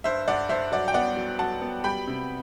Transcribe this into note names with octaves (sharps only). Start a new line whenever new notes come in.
G2 C5 E5
G2 D5 F#5
G2 C5 E5
F#3 D5 F#5
G5
B3 D5 F#5
F#3
F#3 F#5 A5
B3
G3 G5 B5
C3